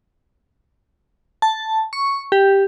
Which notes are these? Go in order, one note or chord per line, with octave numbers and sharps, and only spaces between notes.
A5
C#6
G4